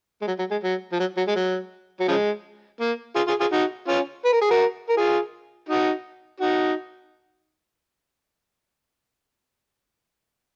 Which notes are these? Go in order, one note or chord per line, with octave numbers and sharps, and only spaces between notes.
G#3
F#3
F#3
G#3
F#3
F3
F#3
F#3
G#3
F#3
F#3
C#3 F3 G#3
A#3
F4 G#4
F4 G#4
F4 G#4
D#4 F#4
C#4 F4
B4
A#4
G#4
F#4 A#4
A#4
F4 G#4
D#4 F#4
D#4 F#4